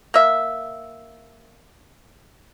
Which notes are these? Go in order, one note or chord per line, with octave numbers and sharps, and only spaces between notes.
A#3 E5